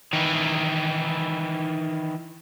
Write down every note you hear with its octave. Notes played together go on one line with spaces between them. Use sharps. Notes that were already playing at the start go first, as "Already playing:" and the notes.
D#3 E3